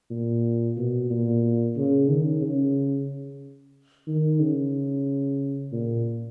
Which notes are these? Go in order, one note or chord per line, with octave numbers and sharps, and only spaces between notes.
A#2
B2
A#2
C#3
D#3
C#3
D#3
C#3
A#2